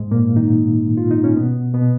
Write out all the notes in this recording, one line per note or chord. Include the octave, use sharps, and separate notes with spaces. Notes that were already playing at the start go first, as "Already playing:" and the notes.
Already playing: G#2 G#3
A#2 A#3
D#3 D#4
F4
D#4
C#4
B2 B3
B2 B3